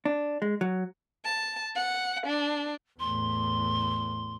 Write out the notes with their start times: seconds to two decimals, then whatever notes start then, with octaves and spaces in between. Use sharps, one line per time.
0.05 D4
0.42 G#3
0.61 F#3
1.25 A5
1.76 F#5
2.26 D4
3.00 E2 A2 C6